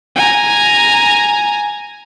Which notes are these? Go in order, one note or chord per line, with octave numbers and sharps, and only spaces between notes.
G#5 A#5